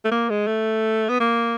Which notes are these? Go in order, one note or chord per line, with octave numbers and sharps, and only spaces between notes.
A3
A#3
G#3
A3
B3
A#3